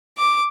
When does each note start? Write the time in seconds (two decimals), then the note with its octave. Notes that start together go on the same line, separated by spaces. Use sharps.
0.18 D6